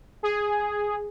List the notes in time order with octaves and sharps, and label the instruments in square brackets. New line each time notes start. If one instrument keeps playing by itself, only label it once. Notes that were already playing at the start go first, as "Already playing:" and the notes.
[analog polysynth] G#4